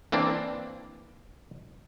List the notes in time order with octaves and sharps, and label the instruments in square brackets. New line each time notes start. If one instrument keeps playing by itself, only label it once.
[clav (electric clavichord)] E3 A#3 C4 D4